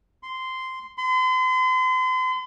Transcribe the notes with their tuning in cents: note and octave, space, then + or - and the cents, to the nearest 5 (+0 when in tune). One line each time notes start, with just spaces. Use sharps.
C6 -10
C6 -40